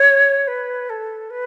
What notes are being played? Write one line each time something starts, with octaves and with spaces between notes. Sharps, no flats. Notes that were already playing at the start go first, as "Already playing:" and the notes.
Already playing: C#5
B4
A4
B4